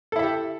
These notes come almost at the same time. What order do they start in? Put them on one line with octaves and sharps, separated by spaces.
A4 E4 E5 G4